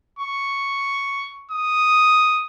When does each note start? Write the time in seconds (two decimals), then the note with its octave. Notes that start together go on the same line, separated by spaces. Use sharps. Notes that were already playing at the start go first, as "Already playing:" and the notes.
0.19 C#6
1.51 D#6